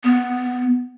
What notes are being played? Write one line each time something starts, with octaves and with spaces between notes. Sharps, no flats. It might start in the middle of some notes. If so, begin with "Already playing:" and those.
B3